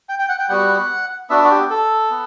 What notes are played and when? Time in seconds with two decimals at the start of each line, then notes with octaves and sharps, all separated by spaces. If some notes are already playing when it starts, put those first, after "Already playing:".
0.09 G5
0.19 G5
0.29 F#5
0.39 G5
0.49 G3 B3 F#4 F#5
1.30 B3 D4 F#4 E5
1.44 F#4
1.50 G4
1.70 A4
2.11 B3